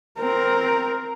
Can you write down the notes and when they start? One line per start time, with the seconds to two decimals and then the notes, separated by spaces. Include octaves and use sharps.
0.19 C4 A#4